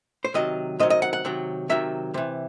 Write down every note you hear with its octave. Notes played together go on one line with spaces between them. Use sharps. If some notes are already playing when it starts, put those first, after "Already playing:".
C5
C3 D#3 F#3 D#5
C3 D#3 F#3 D#5
D#5
F#5
F#5
C3 D#3 F#3
C3 D#3 F#3 E5
C3 E3